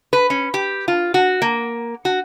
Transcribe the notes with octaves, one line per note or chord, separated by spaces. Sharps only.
B4
C#4
G4
F4
F#4
A#3
F#4